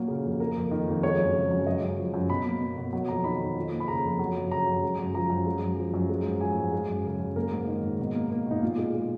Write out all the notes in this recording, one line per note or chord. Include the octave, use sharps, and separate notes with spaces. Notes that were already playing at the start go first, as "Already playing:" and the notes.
Already playing: A#2 F#3 A#3
C#3
F2
A#3 A#4
F2
D#3
F2
G#3 C#5
F#2
C#3
F#2
G#3 D#5
F#2
F3
F#2
B2 B5
A#3
A#3
B2
F#3
F2 A#5
D#3 B5
F2
F3
A#3
B5
C#3 A#5
F2
F#3
F#2
C#3 A#5
F#2
G#3
F#2
F3 A#5
F#2
G#3
F#2
F3
F#2
G#3
G#2
F3 G#5
G#2
G#3
F#2
C#3
F#2
A#3 A#4
G#2
D#3
G#2
B2
A#3
A#3
B2 D#4
A#2 F4
G#3
G#3